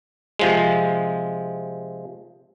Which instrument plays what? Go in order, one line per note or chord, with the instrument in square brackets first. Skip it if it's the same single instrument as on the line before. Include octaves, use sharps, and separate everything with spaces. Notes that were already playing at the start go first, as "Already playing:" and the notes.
[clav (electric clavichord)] C3 F3 G#3